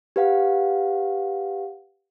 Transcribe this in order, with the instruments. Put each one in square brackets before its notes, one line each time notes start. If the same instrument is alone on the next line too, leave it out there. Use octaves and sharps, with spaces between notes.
[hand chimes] G4 B4 F5 F#5